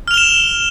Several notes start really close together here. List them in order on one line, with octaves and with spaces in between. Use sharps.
F6 F7 G7 E7